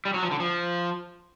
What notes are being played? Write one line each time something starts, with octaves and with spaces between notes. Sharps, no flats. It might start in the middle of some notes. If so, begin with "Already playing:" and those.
G3
F#3
F3
D3
F3